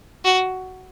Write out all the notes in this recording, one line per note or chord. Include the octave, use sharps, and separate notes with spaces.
F#4